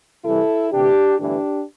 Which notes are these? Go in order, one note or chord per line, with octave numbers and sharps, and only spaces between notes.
C2 C3 E3 G3 E4 A4
D2 C3 E3 D4 G4
G1 G2 E3 A3 D4 G4